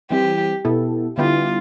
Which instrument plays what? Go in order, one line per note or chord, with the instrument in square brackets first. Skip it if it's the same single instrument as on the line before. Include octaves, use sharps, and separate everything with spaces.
[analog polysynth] E3 G3 C4 [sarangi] G4
[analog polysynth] B2 B3 E4 A4
[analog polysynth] D3 G3 B3 E4 G4 [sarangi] F4